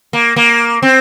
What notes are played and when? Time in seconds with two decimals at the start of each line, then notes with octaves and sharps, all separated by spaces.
0.13 A#3
0.36 A#3
0.82 C4